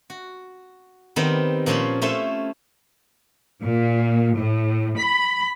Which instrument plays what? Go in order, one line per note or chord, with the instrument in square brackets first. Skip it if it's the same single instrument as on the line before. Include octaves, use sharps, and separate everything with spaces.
[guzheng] F#4
D#3 G3 B3 C4
A#2 F3 C#4 C5 C#5 B5
A3 C#4 E4 F4 C5 E5
[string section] A#2
A2
B5